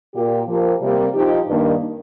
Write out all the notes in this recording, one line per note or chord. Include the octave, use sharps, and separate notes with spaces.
A#2 A#3 G4
F3 A#3 G4
C3 G3 A#3
F3 D#4 G4
G2 D#3 A#3